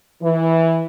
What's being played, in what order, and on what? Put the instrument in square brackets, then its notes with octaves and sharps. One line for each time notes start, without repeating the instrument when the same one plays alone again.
[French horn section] E3